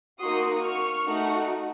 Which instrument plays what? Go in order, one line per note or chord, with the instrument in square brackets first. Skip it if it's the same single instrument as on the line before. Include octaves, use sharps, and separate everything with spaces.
[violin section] A#3 D#4 F#4 C6 D#6
C#6 F6
A3 D#4 F#4